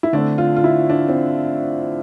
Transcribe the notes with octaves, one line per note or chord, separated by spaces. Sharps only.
E4
D3 A3 C4 D4
F4
F4
E4
D4
C4